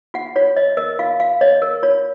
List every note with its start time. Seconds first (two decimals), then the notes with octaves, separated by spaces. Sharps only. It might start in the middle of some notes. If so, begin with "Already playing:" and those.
0.14 F4 F#5
0.36 F4 C#5
0.56 C#5 D#5
0.77 A#4 D#5
0.99 F4 F5
1.20 F4 F5
1.41 C#5 D#5
1.62 A#4
1.83 F4 C#5